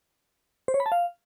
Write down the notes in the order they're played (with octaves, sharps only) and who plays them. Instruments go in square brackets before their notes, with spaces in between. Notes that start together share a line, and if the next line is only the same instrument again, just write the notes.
[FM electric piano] C5
C#5
B5
A5
F5